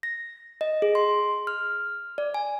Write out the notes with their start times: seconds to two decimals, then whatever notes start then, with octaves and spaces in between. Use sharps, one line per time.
0.03 A#6
0.61 D#5
0.82 G#4
0.95 C6
1.47 F6
2.18 D5
2.34 G#5